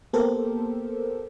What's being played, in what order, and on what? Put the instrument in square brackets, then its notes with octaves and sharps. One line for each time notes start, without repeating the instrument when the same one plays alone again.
[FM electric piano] A#3 B3 G4 A4 A#4 C5